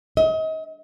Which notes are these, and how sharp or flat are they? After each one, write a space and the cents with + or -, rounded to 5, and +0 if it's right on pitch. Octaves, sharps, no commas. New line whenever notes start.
D#5 +35